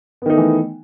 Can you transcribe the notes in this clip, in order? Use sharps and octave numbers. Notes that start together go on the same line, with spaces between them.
D#3 E3 A3 B3 D#4